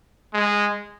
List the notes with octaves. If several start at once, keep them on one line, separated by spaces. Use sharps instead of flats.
G#3